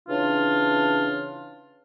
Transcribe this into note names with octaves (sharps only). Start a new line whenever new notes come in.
C#3 E3 D4 F4